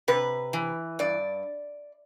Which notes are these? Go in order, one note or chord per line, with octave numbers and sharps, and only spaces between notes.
C3 B4
E3
G2 D5